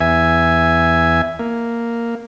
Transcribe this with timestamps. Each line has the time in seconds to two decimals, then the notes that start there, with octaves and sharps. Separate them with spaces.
0.01 E2 E5 G#5
1.39 A#3